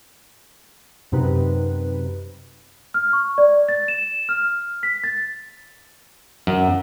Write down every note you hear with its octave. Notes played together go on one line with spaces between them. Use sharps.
F#2 C3 D#4 B4
F6
C#6
D5
A6
E7
F6
B6
A6
F#2